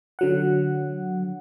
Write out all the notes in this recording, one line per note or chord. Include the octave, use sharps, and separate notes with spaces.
D3 F#3 F#5